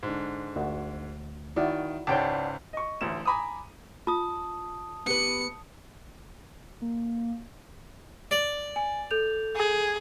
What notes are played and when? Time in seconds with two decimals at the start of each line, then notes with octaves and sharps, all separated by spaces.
0.03 G#2 D3
0.56 D2 F#4
1.56 D#3 E4 F#4 D5
2.07 C#2 G#2 C#5 D5 F#5 G5 A5 D6
2.73 D#5 C#6
3.01 A1 D2 E7
3.25 G#5 A#5 B5 D6 D#6
4.07 F4 A5 D#6
5.06 B3 G4 B4 C#7
6.82 A#3
8.31 D5
8.76 G#5
9.11 A4 G6 F7
9.56 G#4